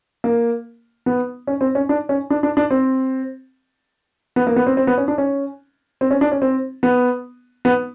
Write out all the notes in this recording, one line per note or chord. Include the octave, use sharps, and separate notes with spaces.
A#3
B3
C#4
C4
C#4
D4
C#4
D4
D4
D4
C4
B3
A#3
B3
C4
C4
B3
C#4
D4
C#4
C4
C#4
D4
C#4
C4
B3
B3